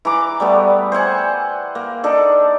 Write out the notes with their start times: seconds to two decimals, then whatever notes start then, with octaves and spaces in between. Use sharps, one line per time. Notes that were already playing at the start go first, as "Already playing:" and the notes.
0.05 E3 A#5 D6
0.40 G3 A3 B3
0.92 C5 E5 F#5 G#5
1.75 A#3
2.04 D4 D#4 A4 D5